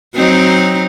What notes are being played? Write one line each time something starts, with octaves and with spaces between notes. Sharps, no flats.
F#3 C4 D#4